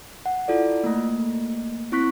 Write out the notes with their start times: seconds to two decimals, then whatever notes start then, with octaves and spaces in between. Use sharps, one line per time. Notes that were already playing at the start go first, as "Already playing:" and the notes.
0.26 F#5
0.48 E4 F4 A4 D5
0.84 A3 A#3
1.92 C4 E4 C#6 F#6 B6